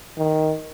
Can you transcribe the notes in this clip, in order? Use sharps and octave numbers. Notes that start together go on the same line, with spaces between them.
D#3